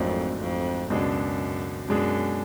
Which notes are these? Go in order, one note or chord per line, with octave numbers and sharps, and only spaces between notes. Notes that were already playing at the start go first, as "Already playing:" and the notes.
Already playing: G#1 F2 G#2 F#3 A3 D4
F2
C#2 F#2 B2 G#3 D4 G#4
F#2 B2 G#3 D4 G#4